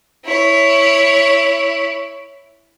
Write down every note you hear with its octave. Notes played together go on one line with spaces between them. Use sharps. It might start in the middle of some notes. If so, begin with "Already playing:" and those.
E4 C#5